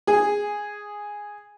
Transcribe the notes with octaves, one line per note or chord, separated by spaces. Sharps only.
G#4